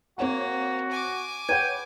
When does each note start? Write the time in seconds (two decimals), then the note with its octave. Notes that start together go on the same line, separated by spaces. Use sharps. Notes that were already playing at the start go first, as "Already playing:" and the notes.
0.18 A#3 C4 F#4 C#5 F#5
0.91 G#5 D6
1.49 B4 C#5 F#5 G5 G#6 D#7